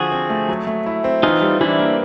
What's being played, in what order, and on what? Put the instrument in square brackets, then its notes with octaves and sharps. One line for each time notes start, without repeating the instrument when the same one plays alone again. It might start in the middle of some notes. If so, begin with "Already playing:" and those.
Already playing: [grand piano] D3 F3 [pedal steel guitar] F#4 G#4
[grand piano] C4
A3
F#3
A3
E4
C4
[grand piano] E3 [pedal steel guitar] D#4 F4
[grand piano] G3
[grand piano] E3 [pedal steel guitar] D4 E4
[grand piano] A#3